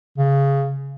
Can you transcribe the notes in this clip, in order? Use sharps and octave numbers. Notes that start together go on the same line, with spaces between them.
C#3